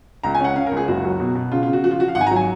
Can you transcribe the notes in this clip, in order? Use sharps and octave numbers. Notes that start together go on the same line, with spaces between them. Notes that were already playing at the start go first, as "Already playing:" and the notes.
C#2 A#5
G#5
C#4 F#5
C#4 F5
A#4
C#2
G#4
F#1 F#4
F#3
B2
B2
C#3 F4
F4
C#3
F#4
F3 F#4
F4
F3 F#4
F5
G#1 F#5
G#5
A#5
F#3
G#5